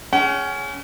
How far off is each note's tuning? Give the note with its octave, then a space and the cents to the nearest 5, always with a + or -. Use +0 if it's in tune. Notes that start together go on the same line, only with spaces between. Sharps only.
C#4 +10 G#4 +0 F#5 +45